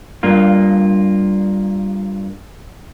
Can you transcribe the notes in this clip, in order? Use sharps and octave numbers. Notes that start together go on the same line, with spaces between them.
G2 A#3 F4